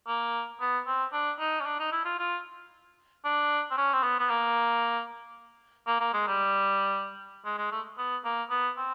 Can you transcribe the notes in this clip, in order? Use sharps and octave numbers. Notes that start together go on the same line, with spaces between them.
A#3
B3
C4
D4
D#4
C#4
D4
D#4
E4
F4
F4
D4
C4
C#4
C4
B3
B3
A#3
A#3
A#3
G#3
G3
G#3
G#3
A3
B3
A#3
B3
C4